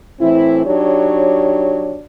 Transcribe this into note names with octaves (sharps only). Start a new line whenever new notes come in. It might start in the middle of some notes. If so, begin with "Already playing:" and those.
A2 E3 C4 E4
F#3 D4 D#4 G4 C#5